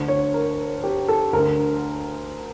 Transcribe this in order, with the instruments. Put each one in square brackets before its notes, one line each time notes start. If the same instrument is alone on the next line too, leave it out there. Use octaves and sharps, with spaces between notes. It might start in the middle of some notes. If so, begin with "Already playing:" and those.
Already playing: [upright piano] D2 D3
C#5
A#4
G4
A4
D2 A#4
D3